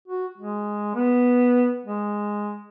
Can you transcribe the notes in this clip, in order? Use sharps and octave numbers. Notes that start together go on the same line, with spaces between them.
F#4
G#3
B3
G#3